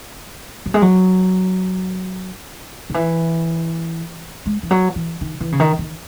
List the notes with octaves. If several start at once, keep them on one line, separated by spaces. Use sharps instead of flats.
F#3
G#3
F#3
D#3
E3
G#3
E3
F#3
E3
D#3
E3
C#3
D#3
D#3